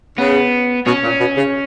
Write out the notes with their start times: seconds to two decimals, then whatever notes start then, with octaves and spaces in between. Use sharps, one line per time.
0.18 C#3 B3
0.86 B2 C#4
1.04 A#2
1.20 B2
1.37 C#3